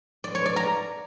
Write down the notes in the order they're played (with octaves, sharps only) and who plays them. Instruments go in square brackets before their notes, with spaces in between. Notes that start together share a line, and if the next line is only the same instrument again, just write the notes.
[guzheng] D5
C#5
D5
A#5